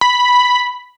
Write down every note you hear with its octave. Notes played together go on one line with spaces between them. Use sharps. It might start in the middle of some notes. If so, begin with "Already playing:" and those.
B5